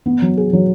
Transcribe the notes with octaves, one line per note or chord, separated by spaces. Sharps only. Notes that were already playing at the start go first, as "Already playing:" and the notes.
B3
F#3
G#4
F#3